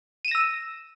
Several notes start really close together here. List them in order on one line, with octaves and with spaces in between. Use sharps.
D#7 E7 A#6 E6